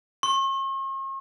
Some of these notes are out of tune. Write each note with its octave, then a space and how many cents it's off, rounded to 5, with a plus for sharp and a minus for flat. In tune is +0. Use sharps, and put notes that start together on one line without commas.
C#6 -45